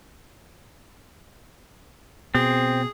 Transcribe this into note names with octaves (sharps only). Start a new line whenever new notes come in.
B2 C4 G#4